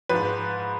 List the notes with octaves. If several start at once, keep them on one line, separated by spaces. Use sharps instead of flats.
G#2 F3 B4